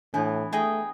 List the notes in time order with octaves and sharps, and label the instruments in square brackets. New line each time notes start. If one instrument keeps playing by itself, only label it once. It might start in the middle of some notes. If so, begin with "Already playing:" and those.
[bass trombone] A2 [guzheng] E3 B3 [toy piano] D4
[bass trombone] A3 [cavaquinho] G#4 G5 [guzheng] D#5